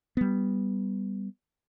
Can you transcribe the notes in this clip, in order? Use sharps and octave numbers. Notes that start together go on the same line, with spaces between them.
G3 B3